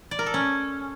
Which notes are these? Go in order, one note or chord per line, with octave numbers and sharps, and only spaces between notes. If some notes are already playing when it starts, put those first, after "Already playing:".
D5
A#4
A4
C#4